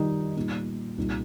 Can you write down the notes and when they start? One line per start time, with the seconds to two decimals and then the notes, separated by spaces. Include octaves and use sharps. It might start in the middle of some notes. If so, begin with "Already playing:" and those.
Already playing: D#3 G3 D#4 G4
0.37 A#2 G3 D#4
0.98 C2 A#2 A#3 D#4